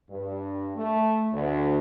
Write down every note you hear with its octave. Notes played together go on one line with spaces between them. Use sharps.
G2
A3
D2